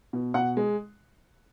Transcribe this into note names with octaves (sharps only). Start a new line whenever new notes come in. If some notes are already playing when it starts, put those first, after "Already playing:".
B2
B2 F#5
G#3